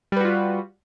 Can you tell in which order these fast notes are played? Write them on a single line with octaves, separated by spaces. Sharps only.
G3 B4 F#4 F4